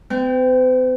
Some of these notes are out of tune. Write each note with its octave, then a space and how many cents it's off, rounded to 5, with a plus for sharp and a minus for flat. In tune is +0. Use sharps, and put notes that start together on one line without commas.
C4 -45 G5 +0